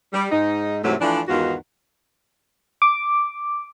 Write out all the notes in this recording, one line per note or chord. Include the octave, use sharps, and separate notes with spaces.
G3
G#2 D#4
G#2 C3 E3 F#3 A3
E3 F3 A3 D4
E2 G#2 D#3 B3 F4 F#4
D6